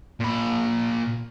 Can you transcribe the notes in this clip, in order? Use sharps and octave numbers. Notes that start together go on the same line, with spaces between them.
A#2 B5